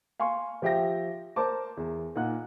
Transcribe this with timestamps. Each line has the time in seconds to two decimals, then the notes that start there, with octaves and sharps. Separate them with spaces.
0.20 F5 G#5 C6 C#6
0.62 F3 G4 E5 G5 A#6
1.36 A#4 C5 A5 D6
1.77 E2
2.16 A#2 D#4 F#5 F#6